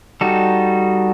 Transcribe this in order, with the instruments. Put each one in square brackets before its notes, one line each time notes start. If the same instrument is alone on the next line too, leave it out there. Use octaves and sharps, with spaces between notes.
[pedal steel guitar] G3 D#4 F#4 A4